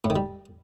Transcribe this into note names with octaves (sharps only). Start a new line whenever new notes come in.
A2
D#3
G3